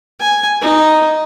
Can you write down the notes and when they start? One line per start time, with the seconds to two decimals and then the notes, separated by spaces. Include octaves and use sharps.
0.20 G#5
0.61 D#4